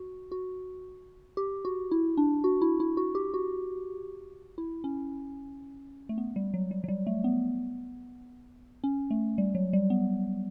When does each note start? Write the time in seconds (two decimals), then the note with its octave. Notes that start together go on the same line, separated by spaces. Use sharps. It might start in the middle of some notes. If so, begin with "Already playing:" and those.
Already playing: F#4
0.32 F#4
1.37 G4
1.65 F#4
1.91 E4
2.17 D4
2.44 F#4
2.62 E4
2.80 E4
2.97 F#4
3.15 G4
3.34 F#4
4.58 E4
4.84 C#4
6.09 A3
6.18 B3
6.36 G3
6.54 F#3
6.71 G3
6.84 F#3
6.88 G3
7.07 A3
7.24 B3
8.84 C#4
9.11 A3
9.38 G3
9.55 F#3
9.73 G3
9.90 B3